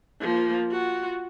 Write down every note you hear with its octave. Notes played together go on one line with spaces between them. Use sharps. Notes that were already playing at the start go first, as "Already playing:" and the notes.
F3 A#3
F4 F#4